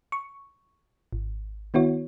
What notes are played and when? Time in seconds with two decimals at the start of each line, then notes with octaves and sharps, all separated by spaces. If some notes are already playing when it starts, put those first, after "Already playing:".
0.12 C#6
1.13 G#1
1.74 D#3 B3 E4 F#4 C#5